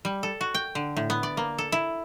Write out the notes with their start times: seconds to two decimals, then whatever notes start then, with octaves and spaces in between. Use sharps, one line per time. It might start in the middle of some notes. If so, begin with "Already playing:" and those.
0.05 G3
0.23 A4
0.41 F#4
0.55 G5
0.75 D3
0.97 A2
1.10 B3
1.23 D5
1.37 A#3
1.58 A4
1.72 E4